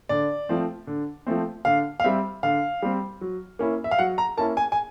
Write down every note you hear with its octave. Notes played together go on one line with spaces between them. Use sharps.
D3 D5
F3 A3 C4
D3
F3 A3 C4
D3 F5
F5
G3 C4 E5
D3 F5
G3 C4
F#3
A#3 C#4 E4
E5
F5
F#3 F#5
A#5
A#3 C#4 E4 A5
G#5
G#5